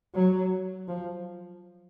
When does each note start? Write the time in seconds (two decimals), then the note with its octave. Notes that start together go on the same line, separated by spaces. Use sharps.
0.15 F#3
0.88 F3